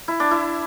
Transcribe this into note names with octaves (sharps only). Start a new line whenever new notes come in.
E4
D4
E4